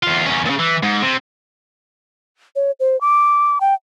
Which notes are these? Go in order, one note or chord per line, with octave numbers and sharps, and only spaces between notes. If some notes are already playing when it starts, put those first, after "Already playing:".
E2 F4
E2 C#4
A#2 C#3
E3
G#2
C3
C#5
C5
D6
G5